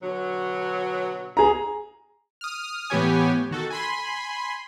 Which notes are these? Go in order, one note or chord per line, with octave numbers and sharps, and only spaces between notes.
B2 D3 F#3
G#4 A#5
D#6 F6
A2 E3 B3 G4 C#5 G#5
D#3 F#4 A4
G#5 B5 C6